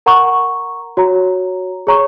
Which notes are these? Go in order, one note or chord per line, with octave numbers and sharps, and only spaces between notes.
A#4 F#5 A#5 C#6
F#4 C#5 A#5
G#4 C#5 A#5 C#6